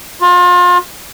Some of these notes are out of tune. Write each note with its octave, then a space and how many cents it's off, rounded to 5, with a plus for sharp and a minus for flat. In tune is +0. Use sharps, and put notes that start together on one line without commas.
F4 +30